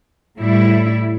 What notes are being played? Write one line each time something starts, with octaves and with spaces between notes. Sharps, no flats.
A2 G3 E4